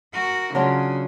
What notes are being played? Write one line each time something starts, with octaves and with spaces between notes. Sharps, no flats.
F#4 A#4
C#3 F#3 D4 F4